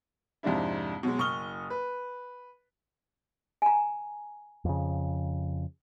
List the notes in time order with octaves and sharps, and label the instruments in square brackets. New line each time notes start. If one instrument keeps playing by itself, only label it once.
[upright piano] F2 G#2 C3 D4 E4
B2 F#3 G#3
F#1 C#6 D#6 F6 G7
B4
[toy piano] G#5 A#5
[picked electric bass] F2 C#3